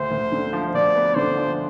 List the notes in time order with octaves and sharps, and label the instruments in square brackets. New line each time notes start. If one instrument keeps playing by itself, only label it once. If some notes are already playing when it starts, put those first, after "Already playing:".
Already playing: [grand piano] D2 [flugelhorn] C5
[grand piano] D2
D3
F3
[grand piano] D2 [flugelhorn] D5
[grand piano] B3
[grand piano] D3 [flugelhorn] C5
[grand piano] F3